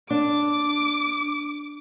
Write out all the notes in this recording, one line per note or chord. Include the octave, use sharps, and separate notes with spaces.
D4 D6